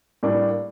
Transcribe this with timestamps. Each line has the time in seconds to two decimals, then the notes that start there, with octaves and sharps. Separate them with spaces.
0.23 A2 G3 A#3 D4